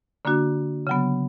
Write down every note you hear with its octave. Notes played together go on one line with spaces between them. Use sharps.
D3 A#3 D4 F#4
C#3 F#3 B3